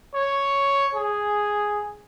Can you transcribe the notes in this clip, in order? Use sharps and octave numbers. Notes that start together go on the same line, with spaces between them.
C#5
G#4